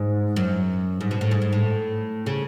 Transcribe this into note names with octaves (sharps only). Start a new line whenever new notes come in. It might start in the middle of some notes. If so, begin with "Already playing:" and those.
Already playing: G#2
F#2
G#2
B2
A2
G#2
G#2
A2
C#3